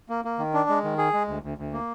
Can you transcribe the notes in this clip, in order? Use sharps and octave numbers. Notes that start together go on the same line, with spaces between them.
A#3
A#3
D#3
D4
G#3
D#3
G#4
G#3
D2
D2
D2
A#3